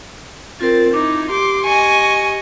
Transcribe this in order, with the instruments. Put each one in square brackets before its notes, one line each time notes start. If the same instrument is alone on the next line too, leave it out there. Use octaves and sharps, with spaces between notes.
[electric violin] C4 A6 [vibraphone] F4 A#4
[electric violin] D#4 E4 [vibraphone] D6
[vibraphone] G4 [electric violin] C6 D6
[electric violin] D#5 C#6 [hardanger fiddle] G#5